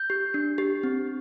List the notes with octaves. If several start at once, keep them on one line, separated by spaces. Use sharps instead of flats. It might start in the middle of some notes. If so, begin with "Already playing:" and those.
Already playing: G6
G4
D4
G4
C4